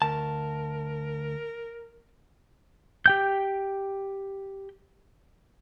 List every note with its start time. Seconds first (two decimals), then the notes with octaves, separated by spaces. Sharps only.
0.02 D2 A#4 A5
3.06 G4 G5 G6